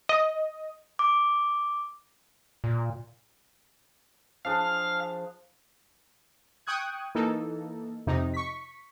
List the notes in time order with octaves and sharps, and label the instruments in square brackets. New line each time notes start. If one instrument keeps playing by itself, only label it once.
[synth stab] D#5
[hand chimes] D6
[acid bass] A#2
[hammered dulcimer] F3 D4 G#4 [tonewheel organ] F5
[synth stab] G5 C#6 D#6 F#6 G#6
E3 A#3 D#4 A4
F2 C3 D#4
C#6 B6